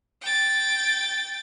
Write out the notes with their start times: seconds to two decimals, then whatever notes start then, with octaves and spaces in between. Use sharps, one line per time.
0.21 G5 A6